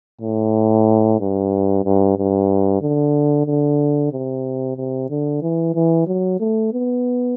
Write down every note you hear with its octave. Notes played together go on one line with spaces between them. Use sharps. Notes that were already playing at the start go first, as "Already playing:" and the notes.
A2
G2
G2
G2
D3
D3
C3
C3
D3
E3
E3
F#3
A3
B3